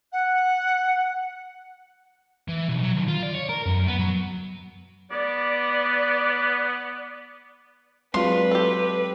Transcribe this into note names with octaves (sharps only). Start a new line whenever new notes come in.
F#5
E3
B1
F#3
D#2
F4
D5
C#5
A#4
F#2
B3
F#3
B3 D5
F#3 G#3 C4 D4 F4 B4 C6
G4 A4